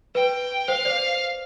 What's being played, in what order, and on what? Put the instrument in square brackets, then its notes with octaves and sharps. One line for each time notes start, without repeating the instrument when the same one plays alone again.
[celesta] B4 [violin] G5
[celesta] C5 [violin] F5
[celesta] C5 D5